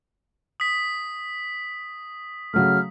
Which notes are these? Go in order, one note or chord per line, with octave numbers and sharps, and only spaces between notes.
D#6 B6
C#3 F#3 A3 F6